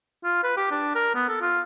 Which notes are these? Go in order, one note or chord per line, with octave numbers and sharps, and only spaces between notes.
F4
B4
G4
D4
A#4
B3
A4
F4